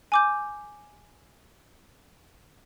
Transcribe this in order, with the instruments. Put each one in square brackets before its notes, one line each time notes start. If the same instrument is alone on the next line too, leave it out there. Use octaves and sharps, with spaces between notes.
[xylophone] G#5 D6 G6